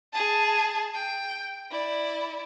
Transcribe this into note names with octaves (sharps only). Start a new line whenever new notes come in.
G#4 A5
G5
E4 D5